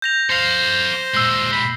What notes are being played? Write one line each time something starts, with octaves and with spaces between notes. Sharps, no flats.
G6 A#6 F7
A4 C5 F5
A#2 G#3 E6 C7
B5